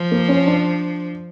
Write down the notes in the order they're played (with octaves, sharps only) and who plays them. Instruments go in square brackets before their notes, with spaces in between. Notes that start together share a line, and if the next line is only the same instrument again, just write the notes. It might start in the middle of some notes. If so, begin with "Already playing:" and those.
Already playing: [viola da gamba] F3
[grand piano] A#3
C#4
D4